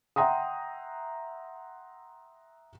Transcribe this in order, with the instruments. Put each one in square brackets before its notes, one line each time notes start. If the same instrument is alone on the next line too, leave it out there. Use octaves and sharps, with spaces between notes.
[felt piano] E5 F#5 G5 A#5 C6 D#6